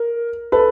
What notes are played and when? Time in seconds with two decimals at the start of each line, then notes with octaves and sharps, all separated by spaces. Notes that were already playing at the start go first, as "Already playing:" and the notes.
Already playing: A#4
0.52 A4 B4